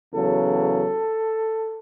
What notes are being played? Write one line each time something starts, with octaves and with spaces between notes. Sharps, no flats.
E2 C#3 F#3 A4